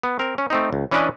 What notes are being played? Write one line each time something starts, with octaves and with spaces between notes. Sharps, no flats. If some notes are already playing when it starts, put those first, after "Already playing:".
B3
C4 A#4
C#4
A3 C4 D#4
C#2
E3 C#4 D4 B4 D5 D#5